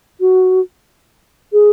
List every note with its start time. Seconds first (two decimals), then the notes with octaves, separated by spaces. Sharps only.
0.20 F#4
1.53 G#4